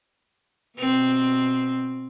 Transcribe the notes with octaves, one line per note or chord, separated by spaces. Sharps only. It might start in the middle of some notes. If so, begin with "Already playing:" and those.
B2 C4